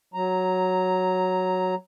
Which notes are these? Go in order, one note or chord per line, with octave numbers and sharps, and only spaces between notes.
F#3 A#5